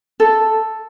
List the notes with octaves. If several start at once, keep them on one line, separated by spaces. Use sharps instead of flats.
A4